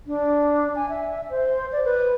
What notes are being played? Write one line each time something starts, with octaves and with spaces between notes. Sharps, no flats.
D4
G#5
E5
C5
D5
B4